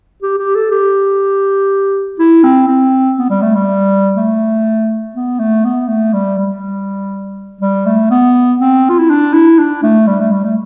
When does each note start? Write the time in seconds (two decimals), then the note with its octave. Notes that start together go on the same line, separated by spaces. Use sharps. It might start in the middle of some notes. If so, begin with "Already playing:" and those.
0.22 G4
0.38 G4
0.56 A4
0.72 G4
2.20 E4
2.44 C4
2.68 C4
3.19 B3
3.30 G3
3.42 A3
3.55 G3
4.17 A3
5.16 B3
5.40 A3
5.65 B3
5.88 A3
6.14 G3
6.38 G3
7.61 G3
7.86 A3
8.11 B3
8.60 C4
8.90 F4
8.99 E4
9.10 D4
9.34 E4
9.59 D4
9.83 A3
10.07 G3
10.21 A3
10.32 G3
10.45 A3